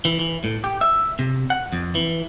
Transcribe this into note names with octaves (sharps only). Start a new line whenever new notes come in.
E3
E3
A2
G4
E5
C3
F#5
F2
E3